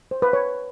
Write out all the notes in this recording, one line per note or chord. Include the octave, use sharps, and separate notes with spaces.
C5
B4
C#5